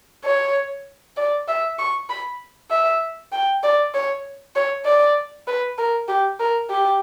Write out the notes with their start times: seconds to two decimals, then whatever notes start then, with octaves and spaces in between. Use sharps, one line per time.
0.25 C#5
1.17 D5
1.48 E5
1.79 C#6
2.09 B5
2.71 E5
3.32 G5
3.63 D5
3.94 C#5
4.56 C#5
4.85 D5
5.47 B4
5.78 A#4
6.08 G4
6.40 A#4
6.70 G4